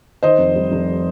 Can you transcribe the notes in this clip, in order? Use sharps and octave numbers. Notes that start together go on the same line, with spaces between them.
D#3 C5 D#5
F1
G3
F1